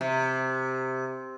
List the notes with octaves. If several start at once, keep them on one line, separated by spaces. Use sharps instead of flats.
C3